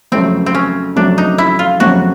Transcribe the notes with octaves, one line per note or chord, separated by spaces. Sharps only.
F2 C#3 F#3 A3 C4
C4
C#4
F2 C#3 F#3 A3 D4
D#4
E4
F4
F2 C#3 F#3 A3 F#4